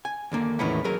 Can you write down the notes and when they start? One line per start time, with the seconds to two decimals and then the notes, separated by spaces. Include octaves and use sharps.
0.05 G#5
0.32 D#2 D3 A#3
0.59 E2 A2 D#3 B3 C#4 E4
0.84 F#3 G#4 A#4